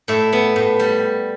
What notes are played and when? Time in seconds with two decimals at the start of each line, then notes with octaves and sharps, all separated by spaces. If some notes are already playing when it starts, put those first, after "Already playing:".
0.08 A2 E5
0.33 B3
0.56 A2
0.79 G3